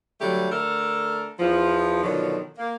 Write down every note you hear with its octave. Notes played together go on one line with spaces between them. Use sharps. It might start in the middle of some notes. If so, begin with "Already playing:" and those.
D3 F#3 G3 A3 G4
D3 A3 A4 A#4
E2 F3
B2 D3 D#3 F3 F#3
A#3